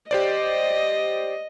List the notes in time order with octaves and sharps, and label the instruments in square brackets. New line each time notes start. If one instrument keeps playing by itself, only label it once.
[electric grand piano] G4 C5 D5 [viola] D#5